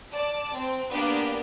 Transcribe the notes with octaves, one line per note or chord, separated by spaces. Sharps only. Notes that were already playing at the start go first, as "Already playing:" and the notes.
D5 A5
C4
A#3 B3 D4 G4